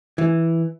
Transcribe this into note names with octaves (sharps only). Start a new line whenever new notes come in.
E3